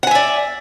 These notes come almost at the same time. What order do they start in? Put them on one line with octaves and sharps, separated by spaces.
F#5 G#5 E5 D5